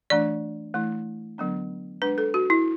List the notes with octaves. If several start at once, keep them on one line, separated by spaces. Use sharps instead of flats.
E3 A3 D4 D5
E3 A3 E4
D3 F#3 B3 D4
G#3 D4 B4
A4
F#4
E4